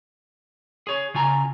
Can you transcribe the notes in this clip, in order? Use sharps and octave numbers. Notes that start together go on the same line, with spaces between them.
G#4 C#5
C#3 F4 G#5 A#5